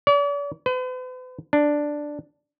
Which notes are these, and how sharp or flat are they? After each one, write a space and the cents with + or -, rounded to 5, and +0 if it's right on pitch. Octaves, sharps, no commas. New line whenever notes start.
D5 -45
B4 +45
D4 +5